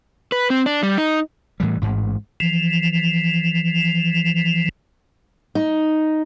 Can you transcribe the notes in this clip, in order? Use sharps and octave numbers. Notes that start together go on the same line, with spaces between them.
B4
C4
D4
G3
D#4
A2 E3 G3
A1 G#2
E3 F3
D#4